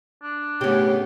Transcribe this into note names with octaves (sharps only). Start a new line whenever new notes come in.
D4
A2 C#3 A3 B3 C#4 G4